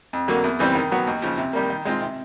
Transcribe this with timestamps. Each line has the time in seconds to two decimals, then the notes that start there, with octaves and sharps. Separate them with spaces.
0.13 F2
0.28 D3 F#3 A#3
0.44 E2
0.59 C#3 E3 G3 C4
0.75 D#3
0.92 F#3 B3
1.07 D#2
1.22 C#3 F3
1.38 C3
1.53 D#3 G3 A#3
1.70 D#3
1.85 G#3 C4 F4
2.01 C3